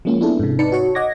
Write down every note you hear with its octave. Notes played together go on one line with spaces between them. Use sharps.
F3 G#3 A#3 C#4 F4
B3 D4 E4 G#4 A4
G#2 C3
D#4 B4 D5 A5 C#7
F#4 C#5
D#5 F#5 D6 G#6 A#6